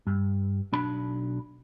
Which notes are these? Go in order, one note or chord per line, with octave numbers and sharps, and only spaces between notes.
G2
B1 D4 B5